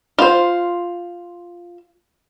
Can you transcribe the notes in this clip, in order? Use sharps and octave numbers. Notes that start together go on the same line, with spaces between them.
F4 C5